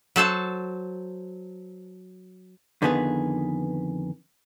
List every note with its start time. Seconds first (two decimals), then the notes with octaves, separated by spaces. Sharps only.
0.16 F#3 A4 C5 A5
2.82 F2 D3 D#3 B3 G#4 B4